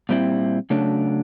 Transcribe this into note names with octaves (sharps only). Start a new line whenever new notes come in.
A#2 G3 C4 E4
C#3 F#3 A3 D4